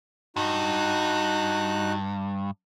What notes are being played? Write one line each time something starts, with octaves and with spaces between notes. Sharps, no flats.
G2 D#4 F#4 F#6